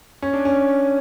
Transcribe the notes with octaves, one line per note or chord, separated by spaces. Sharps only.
C#4
D4
C#4